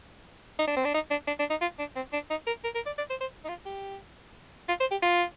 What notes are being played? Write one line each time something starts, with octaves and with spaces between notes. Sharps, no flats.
D#4
D4
C4
D4
D#4
D4
D4
D4
D#4
F4
D4
C4
D4
D#4
A#4
A#4
A#4
D5
D5
C5
C5
D#4
F4
G4
F4
C5
G4
F4